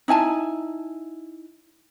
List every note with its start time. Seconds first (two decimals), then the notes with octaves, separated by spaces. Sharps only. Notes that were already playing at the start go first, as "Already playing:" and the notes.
0.08 D#4 E4 G#5 A5